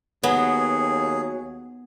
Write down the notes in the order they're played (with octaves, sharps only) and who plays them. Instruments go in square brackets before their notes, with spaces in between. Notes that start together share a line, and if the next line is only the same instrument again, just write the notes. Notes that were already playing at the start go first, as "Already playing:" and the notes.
[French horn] D#2 [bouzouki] F#3 [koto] B3 [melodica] G#4